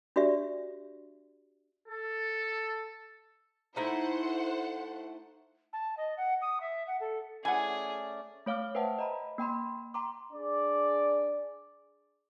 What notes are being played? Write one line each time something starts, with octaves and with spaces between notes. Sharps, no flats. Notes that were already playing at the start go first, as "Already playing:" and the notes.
D4 F#4 G4 D5 E5
A4
A3 D#4 E4 C5 F#5
A5
D#5
F#5
D#6
E5
F#5
A4
E3 A3 C#4 G#4 D5 F#5 G#5
A3 C#5 F5 D6 F6
B4 C5 E5 F#5 G5 A5
D#5 A#5 B5
A#3 G5 B5 C6
G5 A#5 C6 D6
D4 G#4 D5